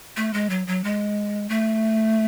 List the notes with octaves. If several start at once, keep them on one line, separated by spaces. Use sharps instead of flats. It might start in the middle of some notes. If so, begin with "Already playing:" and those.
A3
G#3
F#3
F#3
G#3
A3